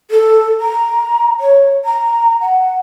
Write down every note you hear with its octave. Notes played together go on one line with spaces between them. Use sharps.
A4
A#5
C#5
A#5
F#5